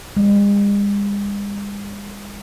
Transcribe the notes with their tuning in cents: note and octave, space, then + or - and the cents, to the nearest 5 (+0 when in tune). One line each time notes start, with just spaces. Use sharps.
G#3 -45